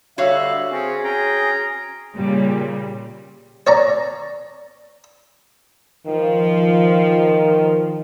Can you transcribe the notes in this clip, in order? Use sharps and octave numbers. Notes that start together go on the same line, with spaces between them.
D3 G3 F#4 C#5 E5 F5 F#6
C4 C#4 G#4
C#4 G5 A#5
A#2 C#3 G3
C#5 D5 A#5
D#3 F3